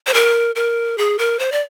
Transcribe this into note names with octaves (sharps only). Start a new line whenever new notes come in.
C5
A#4
A#4
G#4
A#4
C5
D5